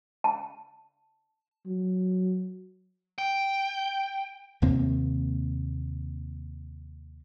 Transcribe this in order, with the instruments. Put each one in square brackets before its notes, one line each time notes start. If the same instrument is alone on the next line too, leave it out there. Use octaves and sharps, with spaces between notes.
[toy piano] A5
[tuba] F#3
[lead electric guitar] G5
[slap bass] D#2 C3 A#3 C4